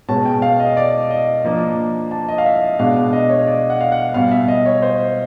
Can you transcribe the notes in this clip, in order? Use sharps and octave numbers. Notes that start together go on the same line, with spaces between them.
B2 G#3 C#4 A5
G5
F5
D#5
D5
D#5
F3 A#3 D4
A5
D#5
F5
E5
B2 G#3 B3 D4 F5
D#5
C#5
D5
F#5
F5
F#5
B2 G3 B3 F5
E5
D#5
C#5
C5